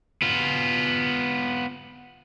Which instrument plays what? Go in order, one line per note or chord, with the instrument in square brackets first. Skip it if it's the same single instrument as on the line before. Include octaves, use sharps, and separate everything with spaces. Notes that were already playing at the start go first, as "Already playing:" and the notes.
[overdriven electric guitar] B3 F4